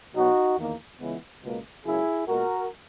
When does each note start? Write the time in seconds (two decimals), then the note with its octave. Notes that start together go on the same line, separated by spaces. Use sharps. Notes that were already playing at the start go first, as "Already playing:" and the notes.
0.14 B2 F#3 B3 D#4 F#4
0.57 E2 D#3 A#3
0.99 C#2 C#3 E3 G#3 B3
1.43 C#2 B2 A#3
1.85 C#2 C#3 F#3 A#3 E4 G#4
2.27 A#2 G#3 B3 F#4 A#4